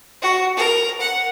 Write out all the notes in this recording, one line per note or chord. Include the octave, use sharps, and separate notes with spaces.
F#4
A#4
F#5